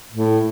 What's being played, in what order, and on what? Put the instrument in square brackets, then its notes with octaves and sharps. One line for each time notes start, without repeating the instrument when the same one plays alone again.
[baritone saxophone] A2